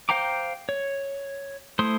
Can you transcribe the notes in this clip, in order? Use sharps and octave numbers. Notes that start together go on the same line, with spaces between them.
C5 F5 G5 A#5 D6
C#5
A3 E4 C5 C6 D#6